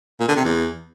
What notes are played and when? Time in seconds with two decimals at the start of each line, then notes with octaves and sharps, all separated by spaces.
0.21 A#2
0.29 D3
0.37 C3
0.45 E2